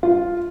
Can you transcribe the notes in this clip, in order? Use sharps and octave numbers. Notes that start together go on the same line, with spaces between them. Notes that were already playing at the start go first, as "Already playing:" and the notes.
F4